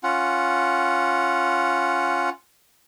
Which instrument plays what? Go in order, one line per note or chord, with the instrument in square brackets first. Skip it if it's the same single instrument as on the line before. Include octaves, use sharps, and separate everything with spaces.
[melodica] C#4 F4 F#5